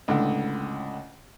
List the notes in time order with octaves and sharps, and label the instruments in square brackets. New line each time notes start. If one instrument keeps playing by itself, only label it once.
[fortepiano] C#2 A2 D3